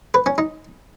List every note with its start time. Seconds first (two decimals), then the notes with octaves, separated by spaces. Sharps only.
0.14 B4
0.26 C#4
0.38 D#4